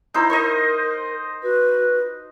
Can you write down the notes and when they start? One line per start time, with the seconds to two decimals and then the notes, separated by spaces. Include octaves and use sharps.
0.14 D#4 E4 C5 A#5
0.30 A#4 C5 D#5
1.43 F#4 B4